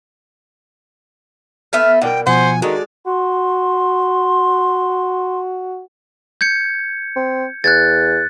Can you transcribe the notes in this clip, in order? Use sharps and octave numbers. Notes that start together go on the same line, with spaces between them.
A3 B3 E5 F6
B2 A#4 D5 F#5 G5
B2 F3 C5 F#5 G#5
D#3 G#3 F#4 A4 D5
F#4 C6
G6 G#6 C#7
C4
E2 F#6 G#6 A6